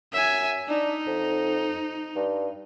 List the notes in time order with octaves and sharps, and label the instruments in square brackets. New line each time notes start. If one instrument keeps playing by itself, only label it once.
[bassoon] F#2 [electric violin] E5 G#5
[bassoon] D4 [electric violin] D#4
[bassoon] F2
G2